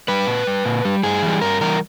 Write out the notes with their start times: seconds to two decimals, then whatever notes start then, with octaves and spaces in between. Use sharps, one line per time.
0.08 G3 B4
0.27 A#2
0.47 G3
0.65 A#2
0.85 G3
1.03 G2 G#4
1.22 E3 G3
1.42 G2 A#4
1.61 E3 G3 A#4